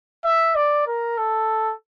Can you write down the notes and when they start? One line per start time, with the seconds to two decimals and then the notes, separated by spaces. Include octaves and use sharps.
0.24 E5
0.55 D5
0.87 A#4
1.18 A4